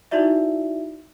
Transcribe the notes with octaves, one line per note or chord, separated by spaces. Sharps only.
D#4 E4 F#4 D5 E5